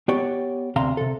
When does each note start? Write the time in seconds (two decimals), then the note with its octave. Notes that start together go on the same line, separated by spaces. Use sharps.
0.08 B3 G4 C#5 D5
0.76 D2 C3 F5 A#5 C6
0.97 C3 A4